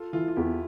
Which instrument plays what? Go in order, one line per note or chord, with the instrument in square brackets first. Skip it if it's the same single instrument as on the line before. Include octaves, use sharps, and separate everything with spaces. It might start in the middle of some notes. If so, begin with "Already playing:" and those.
Already playing: [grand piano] F4 A4
[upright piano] E3 [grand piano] F4 A4
[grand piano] F4
[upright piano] E2 [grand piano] E4 G4